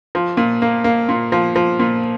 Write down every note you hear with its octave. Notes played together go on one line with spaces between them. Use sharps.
F3
A#2
A#3
A#3
A#2
F3
F3
A#2